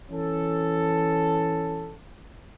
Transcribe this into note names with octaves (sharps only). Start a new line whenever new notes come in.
E3 C#4 A4